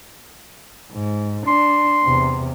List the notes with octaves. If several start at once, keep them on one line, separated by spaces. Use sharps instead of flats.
G#2
D4 C6
E2 C3